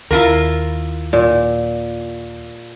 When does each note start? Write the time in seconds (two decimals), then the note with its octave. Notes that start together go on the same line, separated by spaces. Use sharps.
0.11 D#2 E4 F4 A#4
1.13 A#2